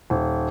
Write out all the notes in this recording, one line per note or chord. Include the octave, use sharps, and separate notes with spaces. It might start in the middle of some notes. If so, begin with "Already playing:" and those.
D#1